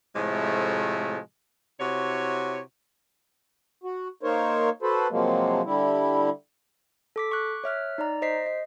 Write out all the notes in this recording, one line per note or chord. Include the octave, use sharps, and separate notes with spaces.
A2 C3 F3 G#3 A3
C3 E4 F#4 C#5
F#4
A#3 D#4 A#4 C5 C#5
F#4 A4 B4 C5
C3 F3 F#3 G#3 A#3
D3 G3 E4
A4 D6 B6
C#6 D6 F#6
C#5 E5 F6 F#6
D#4 D5 A#5
C5 D#5 B6 C7
D#5